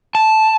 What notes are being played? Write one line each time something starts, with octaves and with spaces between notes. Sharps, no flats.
A5